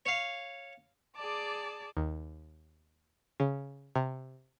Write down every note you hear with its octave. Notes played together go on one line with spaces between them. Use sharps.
C#5 F5
G#4 D5 A5 D6
D#2
C#3
C3